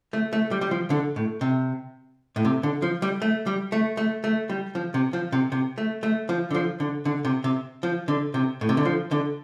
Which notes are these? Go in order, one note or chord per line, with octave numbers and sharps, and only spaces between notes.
A3
A3
G3
G3
F3
D3
A2
C3
A2
C3
D3
F3
G3
A3
G3
A3
A3
A3
G3
F3
C3
F3
C3
C3
A3
A3
F3
D3
F3
D3
D3
C3
C3
F3
D3
C3
A2
C3
D3
F3
D3